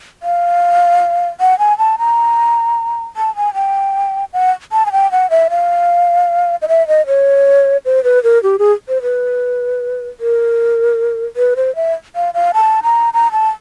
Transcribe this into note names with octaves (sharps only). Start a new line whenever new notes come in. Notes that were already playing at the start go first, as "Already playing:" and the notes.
F5
F#5
G#5
A5
A#5
A5
G#5
G5
F#5
A5
G#5
G5
F#5
E5
F5
D#5
E5
D#5
C#5
C5
B4
A#4
G4
G#4
C5
B4
A#4
B4
C5
E5
F5
F5
A5
A#5
A#5
A5